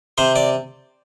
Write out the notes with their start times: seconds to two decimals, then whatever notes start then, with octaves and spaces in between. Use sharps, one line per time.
0.18 C3 C5
0.36 D5